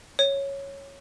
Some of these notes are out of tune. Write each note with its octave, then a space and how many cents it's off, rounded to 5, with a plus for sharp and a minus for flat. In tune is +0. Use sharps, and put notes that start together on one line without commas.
C#5 -5